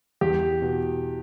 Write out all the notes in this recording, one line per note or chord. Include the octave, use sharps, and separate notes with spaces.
E2 G4
B2